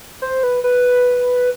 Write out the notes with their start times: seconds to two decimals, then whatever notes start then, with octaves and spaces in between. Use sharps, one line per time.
0.22 C5
0.43 B4
0.64 B4